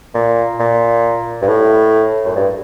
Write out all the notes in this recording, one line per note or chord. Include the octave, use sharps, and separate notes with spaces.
A#2
A#2
G2
A2
F#2
G2